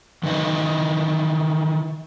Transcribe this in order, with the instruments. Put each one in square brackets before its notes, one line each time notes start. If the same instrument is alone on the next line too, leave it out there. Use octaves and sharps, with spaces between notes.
[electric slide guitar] D#3 E3 D#4 B4 D#5